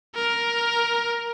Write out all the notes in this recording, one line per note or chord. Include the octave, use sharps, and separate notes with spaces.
A#4